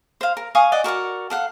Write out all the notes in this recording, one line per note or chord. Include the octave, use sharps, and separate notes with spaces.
C5 F5
A#4
F5 G#5 C#6 D#6
D5 D#5 F#5
F#4 A#4 D5 F#5
A4 F5 F#5